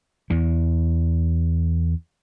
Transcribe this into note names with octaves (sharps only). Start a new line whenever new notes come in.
E2 E3